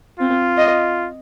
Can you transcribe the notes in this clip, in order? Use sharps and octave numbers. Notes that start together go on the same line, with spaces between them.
C4 F4
D#5